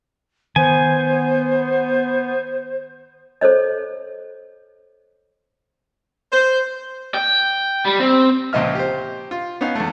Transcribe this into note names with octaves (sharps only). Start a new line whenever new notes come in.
D#3 B3 C5 G#5
A4 C5 C#5 D#5
C5
G5
G3
C4
C#2 A#2 F3 D#5 E5 F6
G4 C5
F4
B3 C#4 D#4 F5
E2 A3